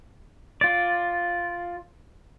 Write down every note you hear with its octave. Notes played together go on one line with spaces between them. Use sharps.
F4 D5